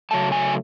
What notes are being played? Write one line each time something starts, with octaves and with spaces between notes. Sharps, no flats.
C#3 F#3 A3 A5
G#5